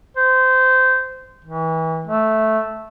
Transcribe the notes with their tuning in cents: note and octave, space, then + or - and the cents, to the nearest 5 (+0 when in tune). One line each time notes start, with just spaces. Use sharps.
C5 -20
E3 -35
A3 -5